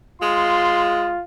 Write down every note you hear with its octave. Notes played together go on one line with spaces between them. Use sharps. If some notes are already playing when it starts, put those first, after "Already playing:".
G#3 F4 C6